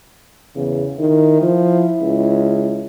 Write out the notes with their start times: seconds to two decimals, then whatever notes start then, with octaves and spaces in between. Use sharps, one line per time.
0.55 E2 C#3
0.99 D#3 E4
1.42 F3
2.01 C#2